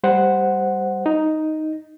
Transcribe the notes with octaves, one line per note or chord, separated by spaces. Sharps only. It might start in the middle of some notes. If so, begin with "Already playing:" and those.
G3 C5 F#5
D#4